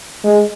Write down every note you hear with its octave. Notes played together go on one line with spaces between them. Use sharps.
G#3